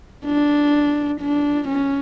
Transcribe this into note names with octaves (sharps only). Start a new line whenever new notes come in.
D4
D4
C#4